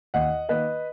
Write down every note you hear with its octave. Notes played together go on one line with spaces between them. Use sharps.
D#2 D#5 F#5
D#3 A#3 B4 D#5